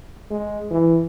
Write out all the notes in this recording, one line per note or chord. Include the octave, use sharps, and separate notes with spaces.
G#3
E3